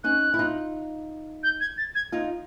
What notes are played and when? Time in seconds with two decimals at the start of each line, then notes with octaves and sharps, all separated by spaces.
0.04 C#4 D#4 F#6
0.34 E4
0.39 D#4 F4
1.43 G6
1.61 G#6
1.78 A6
1.95 G#6
2.12 D#4 F4